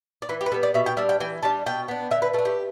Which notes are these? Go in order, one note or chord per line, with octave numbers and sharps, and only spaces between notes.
D5
E3 B4
G4
B4
G3 B3 A4
D5
B2 E5
G5
G3 D4 E5
G5
E3 G5
G3 D4 A5
B2 G5
B3 D4
D3 E5
B4
A3 A4
D4
G4